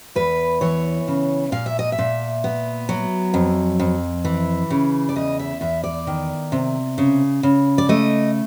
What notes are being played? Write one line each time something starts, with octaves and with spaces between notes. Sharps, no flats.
E2 B4
E3 C#5
C#3
A#2 F5
E5
D#5
E5
A#2
B3
F#3
F2
F2
E3
C#3
D5
E2 D#5
E5
E2 E5
D5
D#3
C3
C#3
C#3
D5
A3 D#5